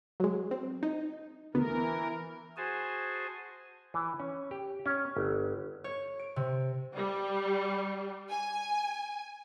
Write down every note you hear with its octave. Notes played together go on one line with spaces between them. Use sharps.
F#3 G#3
C4
D#4
D2 E3 B3 A#4
F#4 G#4 C5 G#5 A5
E3
C#4
G4
C#4
G1
C#5
D7
C3
G3
G#5